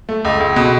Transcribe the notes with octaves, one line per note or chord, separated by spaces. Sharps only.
A3
C#2
C#2
B2